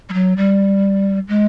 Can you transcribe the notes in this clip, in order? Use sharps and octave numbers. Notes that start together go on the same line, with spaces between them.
G3
F#3
G3
G#3